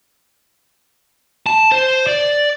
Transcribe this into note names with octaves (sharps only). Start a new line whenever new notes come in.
A5
C5
D5